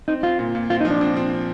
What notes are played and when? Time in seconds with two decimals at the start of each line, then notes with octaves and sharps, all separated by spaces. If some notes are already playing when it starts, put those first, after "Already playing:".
0.08 C4 D#4
0.23 C4 F4
0.39 A#2
0.55 A#2
0.70 C4 F4
0.81 D#4
0.85 F3
0.91 D4
1.01 C4
1.17 C4